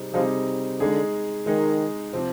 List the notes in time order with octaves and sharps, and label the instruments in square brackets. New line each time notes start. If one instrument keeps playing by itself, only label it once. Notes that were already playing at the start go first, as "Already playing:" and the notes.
Already playing: [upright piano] C3 G3 C4 D#4 G#4
[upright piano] C3 G3 C4 D#4 G#4 [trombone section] F3
[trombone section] D3 [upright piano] G#3 D#4 G#4
[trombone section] D#3 [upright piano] G#3 D#4 G#4
[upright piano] C3 F3 C4